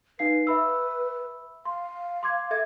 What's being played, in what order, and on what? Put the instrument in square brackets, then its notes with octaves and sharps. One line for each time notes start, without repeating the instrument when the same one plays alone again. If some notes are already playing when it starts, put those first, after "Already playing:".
[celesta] D#4 F5 C7 [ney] B4
[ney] B4 [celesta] E5 B5 E6
[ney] F5 [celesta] C6
[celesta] C6 D6 G#6
A4 E5 G#6